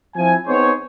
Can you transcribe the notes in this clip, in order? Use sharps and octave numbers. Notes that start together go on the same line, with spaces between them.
F3 C4 E4 G#5
B3 C4 D#4 G#4 C5 C#5